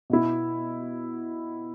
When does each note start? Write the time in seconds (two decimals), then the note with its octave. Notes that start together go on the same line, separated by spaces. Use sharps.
0.10 B2 B3 E4